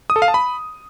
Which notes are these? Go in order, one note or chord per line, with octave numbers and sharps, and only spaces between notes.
D#6
A4
F5
A5
B5